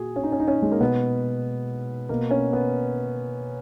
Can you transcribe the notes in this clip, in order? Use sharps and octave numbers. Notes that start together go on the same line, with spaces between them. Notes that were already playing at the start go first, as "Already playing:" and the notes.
Already playing: A#2 F#4 G#4
C#4
D#4
C#4
D#4
C#4
G#3
A#3
B2 B3
B2 A#3
C#4
B3